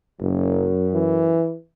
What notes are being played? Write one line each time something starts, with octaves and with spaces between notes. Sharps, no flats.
F#1 F#2
E3